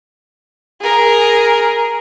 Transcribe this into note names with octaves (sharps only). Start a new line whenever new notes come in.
G#4 A#4